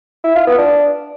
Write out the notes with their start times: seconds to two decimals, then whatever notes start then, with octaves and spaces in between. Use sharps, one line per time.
0.24 E4
0.35 F4
0.47 B3
0.58 D4